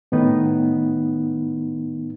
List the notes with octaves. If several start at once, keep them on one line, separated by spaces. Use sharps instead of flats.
A2 D#3 B3 D#4